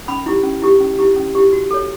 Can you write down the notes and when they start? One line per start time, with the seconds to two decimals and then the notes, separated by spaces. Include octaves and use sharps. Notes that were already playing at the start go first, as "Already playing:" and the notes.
0.08 C#4 B5
0.26 E4 G4
0.44 C#4
0.62 E4 G4
0.80 C#4
0.99 E4 G4
1.16 C#4
1.35 E4 G4
1.53 F#4
1.71 A4 C#5